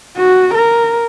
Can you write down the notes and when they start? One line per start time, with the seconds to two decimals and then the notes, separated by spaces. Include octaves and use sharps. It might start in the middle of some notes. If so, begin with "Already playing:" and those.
0.16 F#4
0.54 A#4